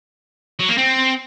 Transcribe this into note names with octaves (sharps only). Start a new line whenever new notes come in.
F#3
A#3
C4